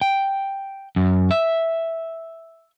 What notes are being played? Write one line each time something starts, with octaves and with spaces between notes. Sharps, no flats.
G5
F#2
E5